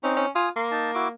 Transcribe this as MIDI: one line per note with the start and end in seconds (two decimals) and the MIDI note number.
0.04 0.26 60
0.04 0.13 61
0.04 0.26 63
0.17 0.30 61
0.35 0.49 65
0.35 0.49 80
0.35 0.49 87
0.56 1.11 58
0.56 0.68 84
0.71 0.91 63
0.71 0.91 81
0.94 1.08 64
0.94 1.08 66
0.94 1.08 86